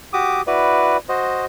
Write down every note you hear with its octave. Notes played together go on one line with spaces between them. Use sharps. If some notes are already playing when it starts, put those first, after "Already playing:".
F#4 G4 D6 D#6
E4 F#4 B4 D5
F#4 C5 D#5